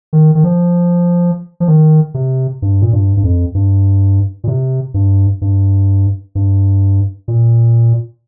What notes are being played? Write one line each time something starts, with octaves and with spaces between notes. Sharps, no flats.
D#3
D#3
F3
F3
D#3
C3
G2
A#2
G2
G2
F2
G2
A#2
C3
G2
G2
G2
A#2